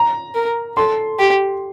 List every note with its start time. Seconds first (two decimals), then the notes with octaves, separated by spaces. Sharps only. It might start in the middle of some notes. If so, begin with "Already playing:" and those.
Already playing: A#5
0.35 A#4
0.77 A4 C6
1.19 G4